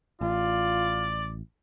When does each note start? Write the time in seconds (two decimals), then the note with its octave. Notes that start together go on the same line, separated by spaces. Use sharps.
0.21 A1 F4 D5